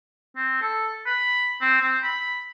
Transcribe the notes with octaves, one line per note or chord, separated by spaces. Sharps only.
C4
A4
B5
C4
C4
B5